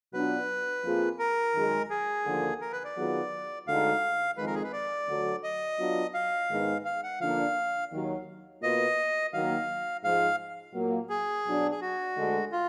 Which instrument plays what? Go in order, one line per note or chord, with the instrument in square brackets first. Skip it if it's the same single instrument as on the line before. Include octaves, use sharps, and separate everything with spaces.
[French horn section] B2 F#3 B3 D4 F4 [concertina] B4
[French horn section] F2 F3 A#3 F4 G#4
[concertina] A#4
[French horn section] F#2 D#3 G#3
[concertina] G#4
[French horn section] D#2 D3 F3 A#3 D4
[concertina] A#4
B4
D5
[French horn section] D#3 F#3 B3 F4 G#4
[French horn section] D2 D3 G#3 D#4 [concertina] F5
[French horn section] F2 D#3 G#3 [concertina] B4
[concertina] A#4
G#4
B4
D5
[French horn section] D2 D3 F#3
[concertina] D#5
[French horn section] F#3 B3 D4 F4
[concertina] F5
[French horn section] G#2 D#3 G#3 B3 D#4
[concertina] F5
F#5
[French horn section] D3 F3 A#3 D4 [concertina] F5
[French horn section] D#2 D#3 F#3
[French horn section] B2 A#3 F4 B4 [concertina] D#5
[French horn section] D#3 F#3 A#3 [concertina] F5
[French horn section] G#2 F3 G#3 [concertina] F5
[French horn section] A#2 F#3 A#3
[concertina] G#4
[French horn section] B2 F#3 D4
[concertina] G#4
F#4
[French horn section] D2 D3 G#3
[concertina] F4